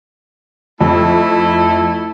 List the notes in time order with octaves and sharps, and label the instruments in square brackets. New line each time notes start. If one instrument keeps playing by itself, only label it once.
[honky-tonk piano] F2 [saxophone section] A3 E4